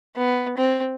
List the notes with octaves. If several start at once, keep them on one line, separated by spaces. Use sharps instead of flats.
B3
C4